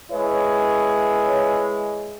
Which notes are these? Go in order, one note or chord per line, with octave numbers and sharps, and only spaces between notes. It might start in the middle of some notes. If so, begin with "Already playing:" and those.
G#3 E4 B4 C#5